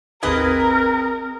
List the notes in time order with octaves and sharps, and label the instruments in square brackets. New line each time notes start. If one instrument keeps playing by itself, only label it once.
[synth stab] G#1 D#2 G#6 [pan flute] C4 [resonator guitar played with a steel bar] G#4 B4 D#5 [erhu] A#4